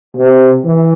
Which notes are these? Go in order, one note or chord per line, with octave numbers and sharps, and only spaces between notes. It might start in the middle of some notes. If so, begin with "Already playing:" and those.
C3
E3